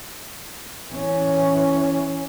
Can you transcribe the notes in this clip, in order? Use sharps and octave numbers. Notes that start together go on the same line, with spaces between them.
E3 C#4